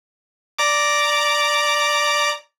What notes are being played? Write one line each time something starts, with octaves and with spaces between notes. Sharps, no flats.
D5 A#5 D6